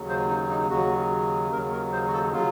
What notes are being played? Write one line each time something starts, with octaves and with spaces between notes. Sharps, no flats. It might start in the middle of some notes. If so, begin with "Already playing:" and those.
Already playing: D#2 C#3 F#3
C5
D#4
D#4
D#2 C#3 F#3 F#4
D#2 C#3 F#3 A#4
A#4
C5
F#4
A4
C#3 F#3 F4